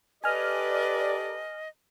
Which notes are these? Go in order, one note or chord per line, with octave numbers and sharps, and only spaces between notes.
G4 A4 B4 D5 D#5 G#5 F6